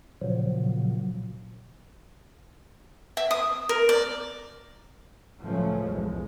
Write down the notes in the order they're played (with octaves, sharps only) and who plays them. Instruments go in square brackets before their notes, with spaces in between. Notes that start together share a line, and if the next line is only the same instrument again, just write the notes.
[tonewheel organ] A#2 C#3 F3 F#3
[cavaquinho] E5
D#6
A#4
D5
[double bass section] C#2 A2 F3 F#3 A3 C#4
B1 E2 G#3